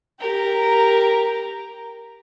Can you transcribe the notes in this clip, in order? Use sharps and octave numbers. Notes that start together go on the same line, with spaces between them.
G4 A#4 A#5